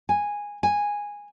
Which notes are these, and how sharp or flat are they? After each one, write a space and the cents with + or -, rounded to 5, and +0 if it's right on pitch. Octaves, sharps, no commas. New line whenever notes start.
G#5 -10
G#5 -10